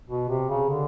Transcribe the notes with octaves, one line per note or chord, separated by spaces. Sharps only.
B2
C3
C#3
D3